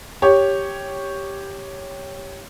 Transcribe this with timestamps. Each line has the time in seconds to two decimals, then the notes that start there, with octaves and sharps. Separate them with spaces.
0.22 G4 C#5